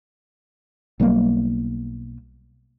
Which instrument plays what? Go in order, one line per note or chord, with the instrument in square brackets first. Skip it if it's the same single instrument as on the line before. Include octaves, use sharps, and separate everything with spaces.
[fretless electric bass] B1 F#3 G3 A#3